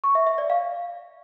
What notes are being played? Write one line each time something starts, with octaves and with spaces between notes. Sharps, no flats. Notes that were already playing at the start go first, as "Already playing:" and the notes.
C#6
E5
E5
D5
F5